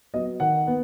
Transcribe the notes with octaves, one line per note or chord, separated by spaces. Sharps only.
F#3 B3 D#5
D#3 F#5
B3